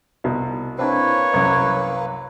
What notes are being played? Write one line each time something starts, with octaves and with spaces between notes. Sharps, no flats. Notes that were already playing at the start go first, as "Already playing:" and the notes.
C2 B2
A#3 C4 D4 E4 B4 C#5
C2 F#2